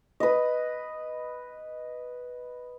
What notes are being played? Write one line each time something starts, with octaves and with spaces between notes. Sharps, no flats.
B4 D#5